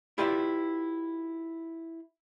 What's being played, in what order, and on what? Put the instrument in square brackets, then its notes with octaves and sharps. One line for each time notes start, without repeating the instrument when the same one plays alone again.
[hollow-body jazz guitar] E4 F4 G4 B4 D5 E5